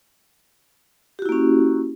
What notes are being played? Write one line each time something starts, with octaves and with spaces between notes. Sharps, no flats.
A#3 C#4 E4 F#4 G4